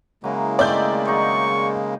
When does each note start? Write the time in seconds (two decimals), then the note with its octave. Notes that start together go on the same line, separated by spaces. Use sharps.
0.24 C#3 F#3 G#3 A#3 E4
0.59 D#3 A3 C4 D5 E5 G6
1.08 F#3 D#4 G#4 C#6